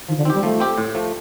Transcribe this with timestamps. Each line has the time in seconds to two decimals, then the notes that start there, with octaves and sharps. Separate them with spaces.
0.08 D#3 F3
0.17 D3
0.25 D#3 C4
0.30 G3 G4
0.43 F3 A3
0.60 C4 G4
0.78 A2
0.95 F3 A3